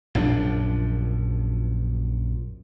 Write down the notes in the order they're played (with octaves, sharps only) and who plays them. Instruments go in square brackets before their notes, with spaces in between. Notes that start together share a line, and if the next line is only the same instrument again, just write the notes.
[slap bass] A#1 F#2 F3 D4